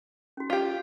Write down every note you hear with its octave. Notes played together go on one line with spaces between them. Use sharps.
C#4 F#4
F4 G4 F5